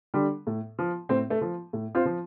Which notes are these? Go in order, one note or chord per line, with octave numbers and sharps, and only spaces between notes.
D3 G3
A2
F3
A2 C4
A3
F3
A2
C4 F4
F3